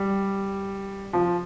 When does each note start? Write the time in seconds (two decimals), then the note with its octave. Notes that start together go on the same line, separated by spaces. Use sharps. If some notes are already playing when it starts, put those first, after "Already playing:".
Already playing: G3
1.13 F3